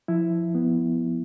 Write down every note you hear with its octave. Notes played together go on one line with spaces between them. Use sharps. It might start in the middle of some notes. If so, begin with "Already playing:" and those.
F3 E4
B3